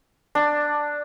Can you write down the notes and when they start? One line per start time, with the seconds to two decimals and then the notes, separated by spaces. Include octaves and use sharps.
0.35 D4